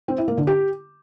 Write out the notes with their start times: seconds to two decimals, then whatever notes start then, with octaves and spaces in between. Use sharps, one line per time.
0.08 C4
0.18 E4
0.28 A#3
0.37 D3
0.47 G4